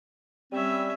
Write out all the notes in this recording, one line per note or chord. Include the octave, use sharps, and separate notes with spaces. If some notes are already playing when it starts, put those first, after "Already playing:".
G3 C4 C#4 E5